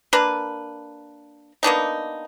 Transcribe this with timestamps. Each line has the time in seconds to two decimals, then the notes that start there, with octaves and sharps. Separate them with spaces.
0.13 A#3 D4 A#4 B4
1.63 A#3 B3 D4 D#4